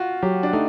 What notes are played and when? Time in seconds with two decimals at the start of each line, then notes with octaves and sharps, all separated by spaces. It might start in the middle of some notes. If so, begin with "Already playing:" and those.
Already playing: F4 F#4
0.23 F#3 G4
0.43 D4
0.53 A3 D#4